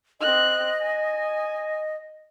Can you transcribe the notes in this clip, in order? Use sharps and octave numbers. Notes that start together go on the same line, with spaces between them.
C4 D#5 F#6
G#5